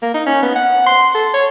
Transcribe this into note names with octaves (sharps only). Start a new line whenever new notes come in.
A#3
D#4
C#4
B3
F#5
C6
A4
C#5